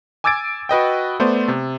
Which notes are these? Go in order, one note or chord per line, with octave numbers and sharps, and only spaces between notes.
G#5 D6 E6 G#6 A6 D7
F#4 B4 D#5 G5
A3 B3 C5 D5
C3